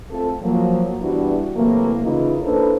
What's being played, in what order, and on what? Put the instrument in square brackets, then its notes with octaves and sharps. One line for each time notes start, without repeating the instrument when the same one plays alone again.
[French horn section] A3 C4 F4 A4
F3 F#3 A#3
E3 G3 B3 D4 E4 F#4
C3 E3 F#3 A3 A#3
C#3 E3 A#3 D#4 F4
A#3 D4 E4 A4 B4 C5